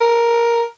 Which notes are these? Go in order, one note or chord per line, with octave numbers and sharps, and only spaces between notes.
A#4